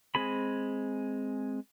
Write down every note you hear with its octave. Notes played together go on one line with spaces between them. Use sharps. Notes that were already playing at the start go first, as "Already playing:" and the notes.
G#3 C4 G#4 B5